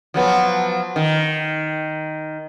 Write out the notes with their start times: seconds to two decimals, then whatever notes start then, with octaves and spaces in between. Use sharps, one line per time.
0.14 F3 F#3 B3
0.96 D#3